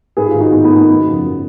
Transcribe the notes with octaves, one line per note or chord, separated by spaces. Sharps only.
G#2 G#4 B4
F4 G#4
D#3
D#4 F#4
G#2 B3 D#4
B3
D#3
B3
F#2
C#3 F3
F#2